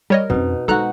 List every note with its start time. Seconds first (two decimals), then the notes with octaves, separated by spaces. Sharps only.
0.10 G3 A#4 C#5 D#5
0.30 F2 B2 C#4 D#4
0.68 G#3 D#4 F#4 A4 A#5 F#6